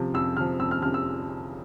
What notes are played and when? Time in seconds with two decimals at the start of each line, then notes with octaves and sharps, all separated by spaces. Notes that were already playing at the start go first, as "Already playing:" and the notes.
Already playing: C3 F3
0.14 F2 E6
0.36 C3 F6
0.40 F3
0.60 F2 E6
0.71 F6
0.82 C3 F3 F6
0.94 E6